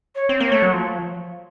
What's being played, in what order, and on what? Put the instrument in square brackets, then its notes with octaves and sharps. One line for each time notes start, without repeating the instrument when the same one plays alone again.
[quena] C#5
[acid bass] C4
[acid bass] A#3 [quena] C#5
[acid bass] A3
F#3
F3